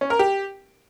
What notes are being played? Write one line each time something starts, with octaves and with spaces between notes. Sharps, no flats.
C#4
A#4
G4